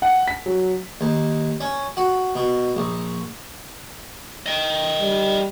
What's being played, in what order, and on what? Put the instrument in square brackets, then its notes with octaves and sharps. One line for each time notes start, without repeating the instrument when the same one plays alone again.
[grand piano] F#5
B6
F#3
[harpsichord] D#2
C#4
F#4
B2
A#1
[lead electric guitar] D#5 G5
[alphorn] G3